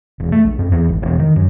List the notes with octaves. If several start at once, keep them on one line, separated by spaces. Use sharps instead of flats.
E1
A3
A#1
F2
E2
G#1
E1
D#3
F#2